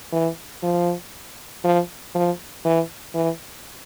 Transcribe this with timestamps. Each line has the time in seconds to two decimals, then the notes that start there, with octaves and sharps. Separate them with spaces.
0.13 E3
0.63 F3
1.64 F3
2.15 F3
2.65 E3
3.14 E3